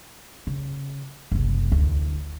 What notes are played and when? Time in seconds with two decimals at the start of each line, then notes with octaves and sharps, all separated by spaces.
0.47 C#3
1.32 F#1 C2
1.72 D2 E4